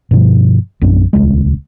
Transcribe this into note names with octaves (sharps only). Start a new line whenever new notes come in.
G2 B2 F3
A#1 F#2 D4
D#1 C#2 G#3